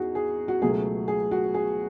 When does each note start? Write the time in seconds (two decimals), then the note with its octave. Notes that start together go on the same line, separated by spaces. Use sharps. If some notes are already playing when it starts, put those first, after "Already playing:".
Already playing: E2 D#4 F#4 G#4
0.15 G#4
0.48 F#4
0.62 C#2 B2 F#3 A3 G#4
1.08 G#4
1.31 F#4
1.54 G#4